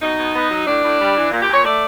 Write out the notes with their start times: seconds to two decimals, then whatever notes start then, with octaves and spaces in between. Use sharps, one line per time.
0.02 B2 D#4
0.18 B2
0.35 B3
0.51 F#3
0.67 A2 D4
0.84 A2
1.00 G3
1.16 E3
1.32 A#2
1.43 G4
1.48 A#2
1.54 C#5
1.65 A3 D5